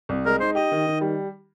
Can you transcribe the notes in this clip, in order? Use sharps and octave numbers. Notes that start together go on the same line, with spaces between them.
C2
G#3 A#4
D#4 C5
G4 D#5
D#3
D#3
G3